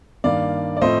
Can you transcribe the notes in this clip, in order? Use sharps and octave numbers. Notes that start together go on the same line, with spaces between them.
G2 D#3 A#3 D5 F5
D5
A2 F3 A3 C4 C5 D#5